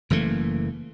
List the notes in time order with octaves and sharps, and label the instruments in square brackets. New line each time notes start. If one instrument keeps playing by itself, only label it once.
[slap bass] F#1 E3 A3 A#3